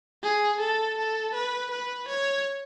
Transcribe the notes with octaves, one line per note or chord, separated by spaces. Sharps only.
G#4
A4
A4
B4
B4
C#5